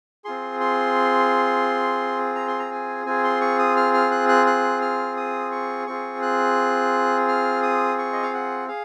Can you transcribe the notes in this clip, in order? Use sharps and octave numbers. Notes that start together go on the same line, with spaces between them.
C4 F4 G#4 C6
C6
A#5
C6
A#5
G#5
C4 F4 G#4 G#5
C6
C#6
D#6
F6
F6
F#6
F#6
F#6
F6
D#6
C#6
C4 F4 G#4 C#6
F#6
F6
D#6
C#6
D#5
F5
F#5
G#4 F5